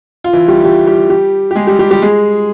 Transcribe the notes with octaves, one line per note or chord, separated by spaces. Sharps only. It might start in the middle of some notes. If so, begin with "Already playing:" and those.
F4
E3 E4
G3 G4
G3 G4
G3 G4
G3 G4
G4
G#3 G#4
G3 G4
G3 G4
G3 G4
G#3 G#4